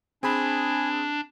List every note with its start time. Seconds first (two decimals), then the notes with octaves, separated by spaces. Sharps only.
0.23 C4 D4 G#4 G#5 B5